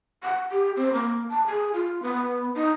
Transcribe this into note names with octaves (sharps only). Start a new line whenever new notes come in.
F#5
G4
C4
A#3
A5
G#4
F4
B3
D#4